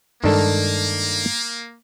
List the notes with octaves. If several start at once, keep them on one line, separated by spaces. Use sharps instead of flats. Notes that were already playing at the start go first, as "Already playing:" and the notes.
G2 D#3 G#3 A#3 D4 A4